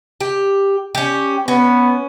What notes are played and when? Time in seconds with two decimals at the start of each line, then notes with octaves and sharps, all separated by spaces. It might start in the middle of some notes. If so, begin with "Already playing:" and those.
0.21 G4
0.95 C#4 G4
1.48 B3 C#4